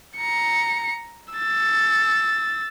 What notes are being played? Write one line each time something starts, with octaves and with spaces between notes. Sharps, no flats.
A#5 C#7
E6 A6